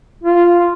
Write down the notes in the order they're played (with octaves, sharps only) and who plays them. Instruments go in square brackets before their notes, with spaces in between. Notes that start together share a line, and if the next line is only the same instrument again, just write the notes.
[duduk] F4